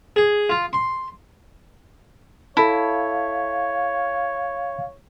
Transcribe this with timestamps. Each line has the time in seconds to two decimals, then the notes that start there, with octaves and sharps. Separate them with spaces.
0.16 G#4
0.49 F4
0.73 C6
2.57 E4 A4 C#5 F5 A5